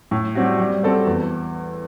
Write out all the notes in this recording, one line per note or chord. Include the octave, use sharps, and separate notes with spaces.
A2
G3 C4 F#4
G3
C4 F#4 A4 C5
E2